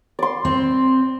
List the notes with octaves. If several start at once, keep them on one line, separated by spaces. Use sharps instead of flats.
D5 C6
C4